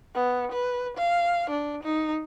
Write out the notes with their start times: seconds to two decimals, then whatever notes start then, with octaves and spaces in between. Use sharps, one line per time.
0.14 B3
0.52 B4
0.97 F5
1.50 D4
1.83 D#4